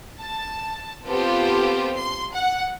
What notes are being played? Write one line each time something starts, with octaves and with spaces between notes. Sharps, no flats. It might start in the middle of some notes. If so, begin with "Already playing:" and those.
A5
B3 C4 F4 G4 A4 C5
C6
F#5